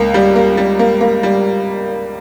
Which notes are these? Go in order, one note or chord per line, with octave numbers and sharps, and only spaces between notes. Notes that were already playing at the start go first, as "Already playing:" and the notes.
Already playing: C#2 A#3
G3
A#3
G3
A#3
A#3
G3